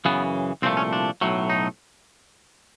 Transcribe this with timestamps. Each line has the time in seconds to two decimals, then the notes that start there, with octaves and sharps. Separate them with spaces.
0.05 F#2 C#3 E3 B3
0.62 C2 A#2 F3 A3 C4
0.77 C#4
0.93 D4
1.21 B1 A2 F#3 A3
1.50 D#4